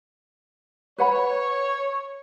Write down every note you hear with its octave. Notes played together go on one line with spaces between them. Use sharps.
B4 C#5 F#5 B5